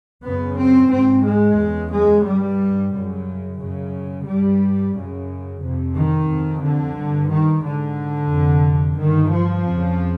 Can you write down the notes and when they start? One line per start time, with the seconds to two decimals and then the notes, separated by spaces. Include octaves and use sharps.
0.23 F#2 C#3 B3
0.57 C4
0.91 G#2 C4
1.25 G#3
1.58 E2 C#3
1.92 G#3
2.25 G2 G3
2.92 F#2 C#3
3.60 F#2 C#3
4.27 G2 G3
4.94 F#2 C#3
5.62 F2 C3
5.95 D#3
6.29 F2 C3
6.62 D3
6.96 G2
7.30 D#3
7.64 G#2 D3
8.31 F2 C3
8.98 G2 D#3
9.32 F3
9.66 F2 C#3